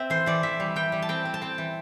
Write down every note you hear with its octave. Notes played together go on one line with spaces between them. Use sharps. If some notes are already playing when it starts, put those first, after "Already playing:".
Already playing: C4 E5
E3 C5
E3 D5
E3 E5
G3
E3 G5
G3
A5
C4 G5
C4
A5
C4 G5
E3